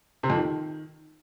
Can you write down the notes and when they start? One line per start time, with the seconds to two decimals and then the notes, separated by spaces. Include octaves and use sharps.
0.23 C3
0.30 F2
0.36 D#3